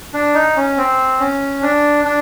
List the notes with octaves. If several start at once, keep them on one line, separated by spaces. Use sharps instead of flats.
D4
D#4
C#4
C4
C#4
D4
D4